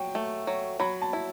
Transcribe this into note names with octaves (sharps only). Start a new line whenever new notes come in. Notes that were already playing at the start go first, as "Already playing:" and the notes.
Already playing: F#3 G5
A3
F#3
F#3 B5
A5
E4